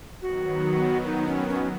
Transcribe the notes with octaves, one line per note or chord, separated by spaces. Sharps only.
D#3 F#3 B3 F#4
D#4
C#4
C#4